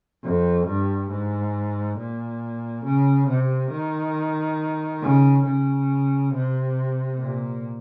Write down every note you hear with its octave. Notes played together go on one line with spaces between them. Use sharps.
F2
G2
G#2
A#2
C#3
C3
D#3
C#3
C#3
C3
A#2